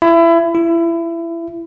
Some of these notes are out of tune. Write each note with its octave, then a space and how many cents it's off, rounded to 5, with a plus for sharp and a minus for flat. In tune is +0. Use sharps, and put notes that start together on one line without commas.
E4 +25
E4 +25